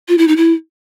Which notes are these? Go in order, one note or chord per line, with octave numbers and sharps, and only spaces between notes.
F4
E4
D#4
E4